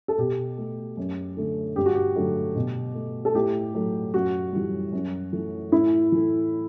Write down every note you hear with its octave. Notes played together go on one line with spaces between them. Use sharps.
A4
B2 G4
A3
F#2
D3 A3
G2 G4
F#4
G4
D3 F#3 A3
B2
A3
A4
A2 G4
F#3 A3
F#2 F#4
E3 G3
F#2
E3 A3
A2 E4
E3 A3